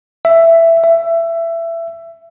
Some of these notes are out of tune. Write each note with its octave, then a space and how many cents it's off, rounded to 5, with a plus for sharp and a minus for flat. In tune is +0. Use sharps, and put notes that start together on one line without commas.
E5 +10
E5 +20